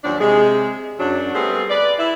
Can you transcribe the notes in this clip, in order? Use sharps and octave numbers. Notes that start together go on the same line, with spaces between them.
D#2 F3 F#3 D4
C3 G#3 G#4
F#2 F#3 D4
G3 A3 B3 C4 G4 G#4
B4 D5
E4